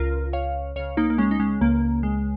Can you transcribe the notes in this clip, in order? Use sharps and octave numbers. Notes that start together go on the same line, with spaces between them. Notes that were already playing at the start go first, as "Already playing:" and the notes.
Already playing: C#2 C#3 F4 A#4
C#5 F5
C#2 C#3 C#5 F5
A#3 D#4
A#3
G#3 C#4
D#4
G#3 C#4
C#2 C#3 A#3
G#3